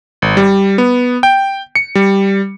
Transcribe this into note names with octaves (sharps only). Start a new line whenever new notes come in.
G#1
G3
B3
G5
C#7
G3